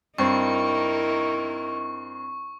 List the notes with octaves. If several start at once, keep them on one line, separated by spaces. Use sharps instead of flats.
G2 C4 D#4 E4 A#4 C#6